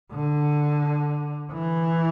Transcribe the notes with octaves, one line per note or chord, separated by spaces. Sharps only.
D3
E3